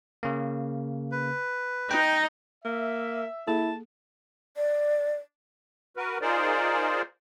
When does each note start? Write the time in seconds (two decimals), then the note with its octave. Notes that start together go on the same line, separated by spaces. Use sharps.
0.23 C#3 A#3
1.12 B4
1.91 D#4 D#5 G5
2.65 A#3 E5
3.47 A#3 E4 G#4 A4 A5
4.57 D5
5.97 F#4 A#4 B4
6.21 D#4 F4 G#4 A#4 C5 D5